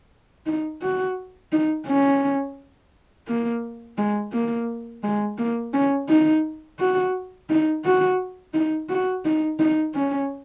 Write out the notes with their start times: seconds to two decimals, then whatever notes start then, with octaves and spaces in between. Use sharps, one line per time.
0.46 D#4
0.82 F#4
1.52 D#4
1.87 C#4
3.28 A#3
3.98 G#3
4.32 A#3
5.03 G#3
5.38 A#3
5.74 C#4
6.09 D#4
6.79 F#4
7.50 D#4
7.84 F#4
8.54 D#4
8.89 F#4
9.25 D#4
9.59 D#4
9.94 C#4